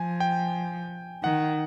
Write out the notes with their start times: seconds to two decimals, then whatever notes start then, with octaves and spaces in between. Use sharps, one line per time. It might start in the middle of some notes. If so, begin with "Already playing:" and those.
Already playing: F3 G#5
0.20 G5
1.23 D#3 F#5